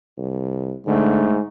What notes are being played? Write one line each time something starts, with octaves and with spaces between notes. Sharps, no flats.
C2
G#2 D3 A3